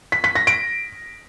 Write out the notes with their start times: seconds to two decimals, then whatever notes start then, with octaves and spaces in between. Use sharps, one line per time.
0.12 B6
0.24 B6
0.35 A#6
0.47 D7